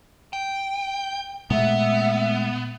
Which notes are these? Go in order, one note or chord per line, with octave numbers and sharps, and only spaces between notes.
G5
A#2 G#3 A3 B3 E5